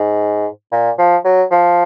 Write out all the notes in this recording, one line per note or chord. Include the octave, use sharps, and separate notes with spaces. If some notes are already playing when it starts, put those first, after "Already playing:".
Already playing: G#2
A#2
F3
F#3
F3